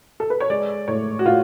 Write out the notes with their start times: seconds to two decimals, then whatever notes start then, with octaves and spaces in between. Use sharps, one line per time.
0.20 A4
0.30 B4
0.40 C#5
0.50 G#3 D5
0.88 A2 C#5
1.19 F#4
1.25 A2 F4